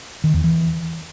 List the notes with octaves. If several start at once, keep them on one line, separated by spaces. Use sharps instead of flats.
D#3
E2
E3